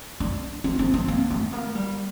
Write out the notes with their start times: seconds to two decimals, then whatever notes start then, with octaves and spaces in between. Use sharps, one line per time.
0.20 D4
0.64 C4
0.79 C4
0.94 C4
1.08 A#3
1.30 A3
1.53 A#3
1.75 G3